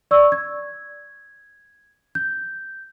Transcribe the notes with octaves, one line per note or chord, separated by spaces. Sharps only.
D5 C#6 E6
G#6
G6